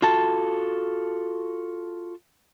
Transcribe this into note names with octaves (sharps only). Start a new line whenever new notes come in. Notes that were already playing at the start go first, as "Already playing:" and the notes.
F4 F#4 A4 A5